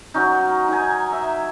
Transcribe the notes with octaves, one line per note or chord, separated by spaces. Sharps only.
F#3 C#4 D#4
D#4 G#5
E5